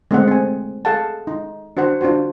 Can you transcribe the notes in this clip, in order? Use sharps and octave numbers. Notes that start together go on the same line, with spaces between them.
G#3 A3 C4 D5 D#5 F#5
C4 G#5
G#4 A4 F5 F#5 A5
D#4
D4 F#4 C5 F#5
D4 F4 F#4 C5